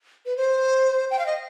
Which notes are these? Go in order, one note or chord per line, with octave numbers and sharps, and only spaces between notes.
B4
C5
G5
F5
D#5